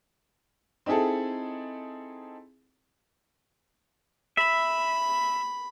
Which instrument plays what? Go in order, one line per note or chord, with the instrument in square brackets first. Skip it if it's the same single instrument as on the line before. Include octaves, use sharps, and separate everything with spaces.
[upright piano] C4 D#4 E4 G#4 A4
[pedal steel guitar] E5 [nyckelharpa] B5